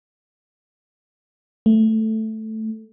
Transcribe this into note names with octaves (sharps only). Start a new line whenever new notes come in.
A3